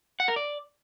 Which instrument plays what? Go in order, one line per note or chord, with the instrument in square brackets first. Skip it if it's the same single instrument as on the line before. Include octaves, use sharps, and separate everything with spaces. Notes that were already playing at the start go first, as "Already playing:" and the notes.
[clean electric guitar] F#5
A#4
D5